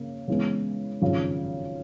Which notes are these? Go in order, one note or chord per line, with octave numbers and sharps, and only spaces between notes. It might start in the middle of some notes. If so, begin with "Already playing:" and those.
Already playing: C#3 A#3
C#3 E3 G#3 B3
G#1 F#2 C#3 F3